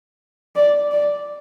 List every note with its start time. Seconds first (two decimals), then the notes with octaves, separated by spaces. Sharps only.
0.55 D5
0.92 D5